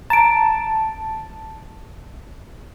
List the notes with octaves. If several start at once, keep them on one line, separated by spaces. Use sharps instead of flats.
A5 A#5 D7